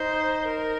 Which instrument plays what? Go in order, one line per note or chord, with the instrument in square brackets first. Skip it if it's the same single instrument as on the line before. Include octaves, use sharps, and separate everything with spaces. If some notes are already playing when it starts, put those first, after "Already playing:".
Already playing: [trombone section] D#4 [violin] C5
[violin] A#4